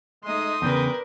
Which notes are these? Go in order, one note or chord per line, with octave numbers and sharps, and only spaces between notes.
G#3 A3 D#4 C6 D#6
E2 A#2 C#3 D4 A#4 B4 G5